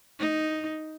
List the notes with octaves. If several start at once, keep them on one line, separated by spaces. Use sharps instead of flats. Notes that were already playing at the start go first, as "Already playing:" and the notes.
D#4